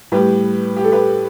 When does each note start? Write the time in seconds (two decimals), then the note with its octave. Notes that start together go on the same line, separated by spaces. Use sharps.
0.12 A2 G3 G4 B4
0.77 G4
0.84 A4
0.92 G4 B4